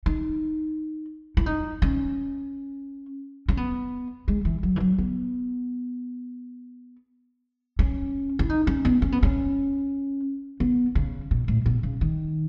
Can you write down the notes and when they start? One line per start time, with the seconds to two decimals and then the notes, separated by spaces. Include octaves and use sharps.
0.06 D#4
1.37 E4
1.46 D#4
1.82 C#4
3.49 C#4
3.57 B3
4.28 G#3
4.45 E3
4.63 F#3
4.76 E3
4.80 F#3
4.98 B3
7.79 C#4
8.39 E4
8.50 D#4
8.67 C#4
8.85 B3
9.02 C#4
9.12 B3
9.23 C#4
10.60 B3
10.95 C#3
11.31 B2
11.48 A2
11.66 B2
11.83 C#3
12.01 D#3